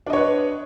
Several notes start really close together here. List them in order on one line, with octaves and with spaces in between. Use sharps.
D4 D#5 C#5 B4